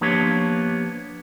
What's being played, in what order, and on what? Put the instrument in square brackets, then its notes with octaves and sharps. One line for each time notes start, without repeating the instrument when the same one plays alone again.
[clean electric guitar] F3 A#3 B3 D4 G4 C#5